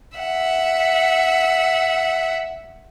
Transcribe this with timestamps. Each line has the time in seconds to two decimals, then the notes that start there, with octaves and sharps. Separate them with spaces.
0.18 E5 F#5